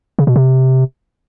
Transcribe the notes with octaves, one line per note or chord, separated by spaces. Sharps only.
C#3
B2
C3